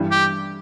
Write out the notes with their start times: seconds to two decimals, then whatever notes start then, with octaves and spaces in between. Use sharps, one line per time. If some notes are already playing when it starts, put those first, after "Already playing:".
Already playing: G2 E3 G3 D4
0.11 G4